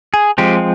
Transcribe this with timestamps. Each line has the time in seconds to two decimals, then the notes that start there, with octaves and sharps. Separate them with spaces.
0.14 G#4
0.38 F3 G#3 C4 G4